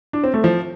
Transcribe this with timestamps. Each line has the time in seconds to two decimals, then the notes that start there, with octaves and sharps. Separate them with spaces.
0.13 D4
0.24 C4
0.34 A3
0.44 F3